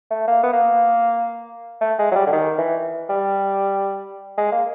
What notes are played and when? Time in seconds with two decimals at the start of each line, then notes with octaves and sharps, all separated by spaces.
0.11 A3
0.28 A#3
0.43 B3
0.54 A#3
1.81 A3
1.98 G#3
2.12 F#3
2.16 G3
2.27 D3
2.32 D#3
2.58 E3
3.09 G3
4.38 G#3
4.52 A#3